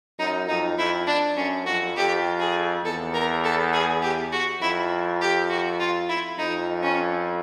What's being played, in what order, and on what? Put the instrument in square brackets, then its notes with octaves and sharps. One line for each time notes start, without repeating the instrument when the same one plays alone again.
[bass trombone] F#2 [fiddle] D#4
[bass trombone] F2 [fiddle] D#4
[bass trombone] F2 [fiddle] E4
[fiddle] D4
[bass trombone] F#2 [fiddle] C#4
[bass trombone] F2 [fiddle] F#4
[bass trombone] F2 [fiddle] G4
[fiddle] G#4
[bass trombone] E2 [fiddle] A4
[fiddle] A#4
A4
G#4
G4
F#4
[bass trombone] F2 [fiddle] E4
[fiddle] G4
F#4
F4
E4
[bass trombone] F2 [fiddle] D#4
[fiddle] C#4